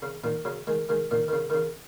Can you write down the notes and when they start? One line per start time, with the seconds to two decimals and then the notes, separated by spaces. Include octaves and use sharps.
0.02 C#3
0.24 A#2 D#3
0.45 C#3 F#3
0.67 D#3 G#3
0.89 D#3 G#3
1.11 A#2 D#3
1.28 D#3
1.33 C#3
1.50 D#3
1.54 C#3